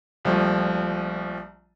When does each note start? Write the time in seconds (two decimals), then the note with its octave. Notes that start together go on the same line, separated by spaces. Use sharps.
0.25 A#1 F3 G3 A3